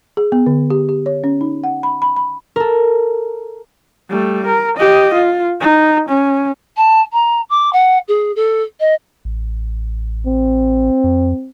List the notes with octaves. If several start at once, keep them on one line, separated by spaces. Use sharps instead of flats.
G#4
B3
D3
G4
G4
C#5
C#4
D#4
F#5
B5
B5
B5
A4 A#4
G3 A3
A#4
G4 D#5
F4
D#4
C#4
A5
A#5
D6
F#5
G#4
A4
D#5
A1
C4
F2